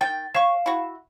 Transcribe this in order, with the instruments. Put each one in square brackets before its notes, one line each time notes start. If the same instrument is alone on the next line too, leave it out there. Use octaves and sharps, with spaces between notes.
[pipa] D#3 G5 [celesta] A6
[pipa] C#5 C#6 [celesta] F5 C7 E7
[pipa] E4 F#4